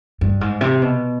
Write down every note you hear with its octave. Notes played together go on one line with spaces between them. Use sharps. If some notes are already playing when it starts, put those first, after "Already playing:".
G2
G#2
C3
B2